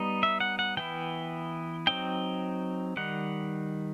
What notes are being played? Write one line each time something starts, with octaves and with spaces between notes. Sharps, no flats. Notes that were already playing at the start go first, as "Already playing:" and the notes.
Already playing: G3 B3 D#4
E5
F#5
F#5
E3 B3 E4 G5
F#3 C4 D#4 G5
D#3 G3 D#4 F#5